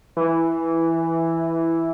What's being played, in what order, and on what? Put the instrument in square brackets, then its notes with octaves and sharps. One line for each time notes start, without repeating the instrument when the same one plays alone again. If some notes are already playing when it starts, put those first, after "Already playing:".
[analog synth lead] E3